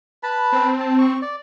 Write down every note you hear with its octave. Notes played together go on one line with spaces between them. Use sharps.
B4 A5 B5
C4
A5
C#6
D5